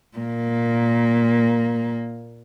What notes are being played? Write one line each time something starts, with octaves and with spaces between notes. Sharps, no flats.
A#2 A#3